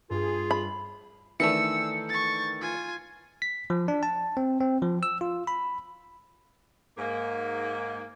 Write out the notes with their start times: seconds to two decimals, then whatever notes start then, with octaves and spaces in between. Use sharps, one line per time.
0.10 G2 F4 G#4
0.51 B5
1.40 D#3 E3 A3 D4 A4 E6 C#7
2.09 C#6 A6
2.61 F4 G#5
3.42 B6
3.70 F3
3.88 D4
4.03 A5
4.37 C4
4.60 C4
4.82 F3
5.03 E6
5.21 F4
5.47 B5
6.98 G#2 A#3